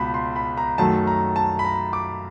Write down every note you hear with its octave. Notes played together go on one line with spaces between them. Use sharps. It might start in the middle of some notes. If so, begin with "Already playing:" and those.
Already playing: C#2 B2 B5
C6
B5
A#5
F#2 D#3 F#3 A3 A5
A#5
A5
B5
A#5
D6